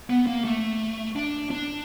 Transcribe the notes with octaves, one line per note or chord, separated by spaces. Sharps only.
B3
A#3
A3
D4
D4